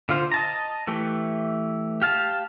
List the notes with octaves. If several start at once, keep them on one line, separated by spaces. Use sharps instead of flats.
D3 F4 C5
D#5 A5 A#5
E3 A3 G4
G4 F5 A5